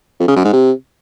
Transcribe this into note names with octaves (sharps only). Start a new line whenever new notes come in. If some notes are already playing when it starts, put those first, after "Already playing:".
F2
C#3
F#2
G#2
C3